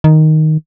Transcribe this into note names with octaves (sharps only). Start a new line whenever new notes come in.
D#3